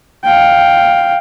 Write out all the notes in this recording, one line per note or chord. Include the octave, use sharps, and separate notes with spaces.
F5 G5